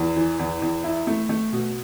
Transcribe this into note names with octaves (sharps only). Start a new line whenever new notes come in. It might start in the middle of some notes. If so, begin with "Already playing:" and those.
Already playing: E2
E3
E2
E2
E4
A3
A3
B2